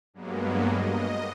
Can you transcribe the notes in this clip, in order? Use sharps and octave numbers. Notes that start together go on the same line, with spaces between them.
G2 F#3 G#3 A#3 B3
D#5